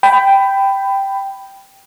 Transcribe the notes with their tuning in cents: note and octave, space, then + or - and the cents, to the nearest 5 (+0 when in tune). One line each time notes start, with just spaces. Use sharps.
G5 +0 B5 +20